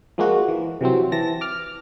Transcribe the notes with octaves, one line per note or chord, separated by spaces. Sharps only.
F3 G#3 A#3 F#4
E3
C3 E3 F#3 C4
E3 A5 A#6
D6 F6